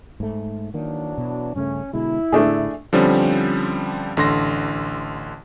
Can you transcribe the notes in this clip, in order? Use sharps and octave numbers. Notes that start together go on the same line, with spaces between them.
G#2 A3
D#3 E3 F#3 A#3 D4
B2
G2 C#3 A3 C#4
B2 D3 G#3 E4
A2 D3 A3 D4 G#4
D3 F3 G3 C4 C#4
A1 D3 C6 A#6